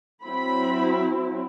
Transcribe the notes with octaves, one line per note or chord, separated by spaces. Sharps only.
F#3 C4 E4 B5